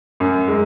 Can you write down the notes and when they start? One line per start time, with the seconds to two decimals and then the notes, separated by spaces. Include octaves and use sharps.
0.20 F#2
0.48 G#3